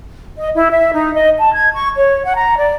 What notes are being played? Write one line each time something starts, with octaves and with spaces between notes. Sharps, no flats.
D#5
E4
E5
D#4
D#5
A5
G#6
C#6
C#5
F#5
A#5
D5